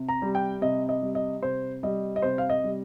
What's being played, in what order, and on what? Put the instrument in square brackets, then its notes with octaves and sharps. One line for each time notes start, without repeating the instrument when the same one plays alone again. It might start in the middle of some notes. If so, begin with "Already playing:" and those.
Already playing: [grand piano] C3
A#5
G3
G5
C3 D#5
D#5
G3
D#5
C3 C5
G3 D#5
D#5
C3 C5
F5
D#5
G3